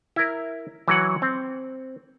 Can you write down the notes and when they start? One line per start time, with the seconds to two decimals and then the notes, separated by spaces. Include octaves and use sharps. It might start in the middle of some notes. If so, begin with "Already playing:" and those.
0.16 E4 A#4
0.88 E3 F#3 F#5
1.22 C4